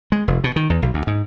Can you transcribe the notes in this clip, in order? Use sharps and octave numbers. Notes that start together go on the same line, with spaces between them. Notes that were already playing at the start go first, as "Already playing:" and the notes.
G#3
F1
B2
D#3
E2
B1
D2
G#2